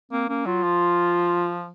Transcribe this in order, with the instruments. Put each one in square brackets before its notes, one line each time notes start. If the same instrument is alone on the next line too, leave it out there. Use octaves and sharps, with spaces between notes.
[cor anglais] A#3 [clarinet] C4
[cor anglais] A#3 [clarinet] C#4
[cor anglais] F#3 [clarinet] F4
[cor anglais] F3